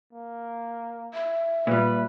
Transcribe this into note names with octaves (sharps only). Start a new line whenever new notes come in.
A#3
E5
A#2 G3 B4